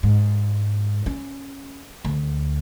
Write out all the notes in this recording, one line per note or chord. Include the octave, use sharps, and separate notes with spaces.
G#2
C#4
D2